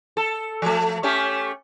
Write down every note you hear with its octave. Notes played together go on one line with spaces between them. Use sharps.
A4
F3 A3
A3 C#4 G4